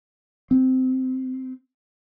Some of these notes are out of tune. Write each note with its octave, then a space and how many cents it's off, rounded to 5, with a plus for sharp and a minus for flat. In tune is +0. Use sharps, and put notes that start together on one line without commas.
C4 -15